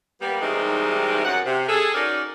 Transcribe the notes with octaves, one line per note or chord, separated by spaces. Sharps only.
G3 A#3 B3
C3 D#3 E3 G3 G#3 D#4
F#2 F#5
C3
G#4 A4
C#4 D#4 F#4 A#4 D5